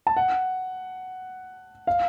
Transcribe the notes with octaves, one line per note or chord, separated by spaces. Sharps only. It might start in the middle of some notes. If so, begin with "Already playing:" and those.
A5
F#5
F5